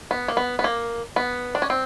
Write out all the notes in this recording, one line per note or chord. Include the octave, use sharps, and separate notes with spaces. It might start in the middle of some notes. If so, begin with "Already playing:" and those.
B3
A#3
B3
B3
A#3
B3
D4
C#4
C4